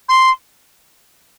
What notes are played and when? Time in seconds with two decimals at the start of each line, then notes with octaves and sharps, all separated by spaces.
0.09 C6